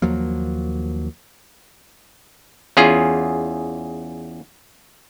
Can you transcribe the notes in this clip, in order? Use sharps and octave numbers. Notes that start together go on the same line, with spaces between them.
D#2 F3 F#3 A#3
E2 C#4 F4 G#4